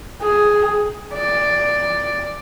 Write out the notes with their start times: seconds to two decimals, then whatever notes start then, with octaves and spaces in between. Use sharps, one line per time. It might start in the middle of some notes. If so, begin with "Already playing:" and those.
0.21 G#4
1.14 D5